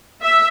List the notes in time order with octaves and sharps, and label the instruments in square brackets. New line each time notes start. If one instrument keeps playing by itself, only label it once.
[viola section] E5